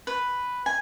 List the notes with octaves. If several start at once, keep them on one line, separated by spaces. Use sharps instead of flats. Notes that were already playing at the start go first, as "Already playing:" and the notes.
B4
G#5